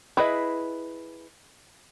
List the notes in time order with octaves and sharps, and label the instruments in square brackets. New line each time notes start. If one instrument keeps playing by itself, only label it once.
[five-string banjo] E4 G#4 B4 D#5